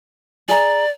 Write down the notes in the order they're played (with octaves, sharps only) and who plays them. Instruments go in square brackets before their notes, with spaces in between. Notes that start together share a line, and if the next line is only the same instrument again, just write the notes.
[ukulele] G#4 A#5 [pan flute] D5